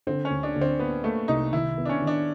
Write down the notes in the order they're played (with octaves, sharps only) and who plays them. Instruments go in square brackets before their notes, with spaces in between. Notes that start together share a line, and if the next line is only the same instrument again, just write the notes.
[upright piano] D3 [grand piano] C4
[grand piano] C#4
[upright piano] D2
[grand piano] D4
[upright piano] D2
[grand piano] C4
[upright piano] A#3 [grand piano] B3
[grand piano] A3 [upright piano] A#3
[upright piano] C2 [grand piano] D#4
[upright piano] D#3 [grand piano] E4
[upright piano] B3
[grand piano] D4
C#4
[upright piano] D#3
[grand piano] D4